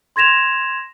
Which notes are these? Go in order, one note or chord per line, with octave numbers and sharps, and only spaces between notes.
C6 G#6 A#6 E7 F7